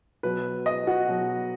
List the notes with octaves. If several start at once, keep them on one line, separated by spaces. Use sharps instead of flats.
B2 F#3 B4
D#5
F#4
B2 F#3